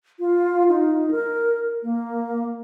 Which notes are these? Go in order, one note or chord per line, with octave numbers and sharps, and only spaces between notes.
F4
D#4
A#4
A#3